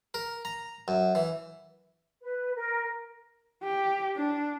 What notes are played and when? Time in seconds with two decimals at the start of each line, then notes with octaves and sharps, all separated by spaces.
0.14 A#4
0.45 A#5
0.88 F#2
1.15 E3
2.21 B4
2.55 A#4
3.64 G4
4.16 D4